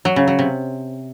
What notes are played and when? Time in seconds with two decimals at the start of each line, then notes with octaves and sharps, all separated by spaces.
0.05 F#3
0.16 C#3
0.27 F#3
0.39 C3